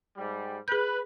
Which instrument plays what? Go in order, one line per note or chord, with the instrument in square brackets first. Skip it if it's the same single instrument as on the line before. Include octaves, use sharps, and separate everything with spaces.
[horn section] G#2 G3
[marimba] G#4 G6 [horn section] B4